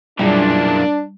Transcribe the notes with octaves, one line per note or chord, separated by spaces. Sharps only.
B1 F#2 A#2 E3 G3 D4 G#4